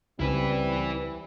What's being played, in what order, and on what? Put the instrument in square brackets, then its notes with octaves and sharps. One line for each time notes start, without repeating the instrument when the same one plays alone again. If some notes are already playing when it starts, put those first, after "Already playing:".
[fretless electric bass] C#2 [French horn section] G3 C4 [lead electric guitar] E4 B4